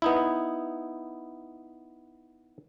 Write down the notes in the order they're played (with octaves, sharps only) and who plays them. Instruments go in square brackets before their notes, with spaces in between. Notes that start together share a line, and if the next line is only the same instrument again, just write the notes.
[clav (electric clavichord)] B3 D#4 E4